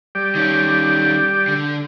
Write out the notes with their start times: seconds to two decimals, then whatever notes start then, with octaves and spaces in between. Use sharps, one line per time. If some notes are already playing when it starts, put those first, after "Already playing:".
0.15 G3 G4 D5
0.35 D#3 C#4
1.48 D3